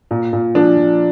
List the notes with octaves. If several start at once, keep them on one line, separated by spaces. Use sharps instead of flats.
A#2
A#2
F3 D4
F3